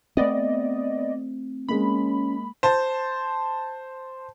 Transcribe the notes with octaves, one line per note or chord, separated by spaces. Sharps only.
A3 B3 C4 D5 D#5
G#3 A#3 C#4 B5
C5 A5